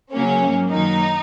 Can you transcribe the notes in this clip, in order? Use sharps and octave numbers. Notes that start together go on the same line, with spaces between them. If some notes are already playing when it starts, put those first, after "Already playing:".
C#3 F#3 A#3 C#4
G#2 F#3 A#3
F#2 D#3 F#3 A#3 D#4